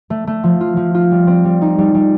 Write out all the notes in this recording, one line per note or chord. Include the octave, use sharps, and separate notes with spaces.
A3
A3
F3
F4
F3
F4
G3
C4
G3
D#4
G3
G3